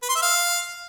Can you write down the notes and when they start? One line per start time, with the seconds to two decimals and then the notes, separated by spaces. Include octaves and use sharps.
0.02 B4
0.09 C6
0.16 E5
0.22 F5